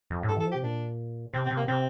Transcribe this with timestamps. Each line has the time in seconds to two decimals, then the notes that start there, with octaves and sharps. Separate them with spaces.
0.10 F2
0.23 A2
0.29 G2 A4
0.37 E3
0.40 A4
0.46 F3
0.52 G4
0.55 C3
0.63 A#2 D4
1.34 C3 C4
1.46 C4
1.51 C3
1.57 A#3
1.68 C3 C4